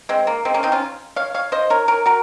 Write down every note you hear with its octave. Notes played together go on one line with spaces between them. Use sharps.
G#3 C4
A#3
G#3 C4
A#3 C#4
C4 D#4
C#4 F4
C#5 F5
C#5 F5
C5 D#5
A#4 C#5
A#4 C#5
F#4 A#4